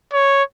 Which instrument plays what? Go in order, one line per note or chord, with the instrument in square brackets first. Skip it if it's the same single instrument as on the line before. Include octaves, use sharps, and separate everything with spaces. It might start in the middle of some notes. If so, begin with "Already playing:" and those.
[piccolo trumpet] C#5